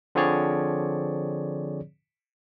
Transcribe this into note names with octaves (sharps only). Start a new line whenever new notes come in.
D3 F3 C4 G#4 C#5 D5